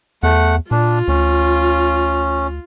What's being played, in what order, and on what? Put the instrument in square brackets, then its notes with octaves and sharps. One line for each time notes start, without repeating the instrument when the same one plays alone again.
[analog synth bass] E2 [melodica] A3 F#5
[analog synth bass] A#2 [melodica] D4 [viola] F4
[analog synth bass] D2 [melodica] C#4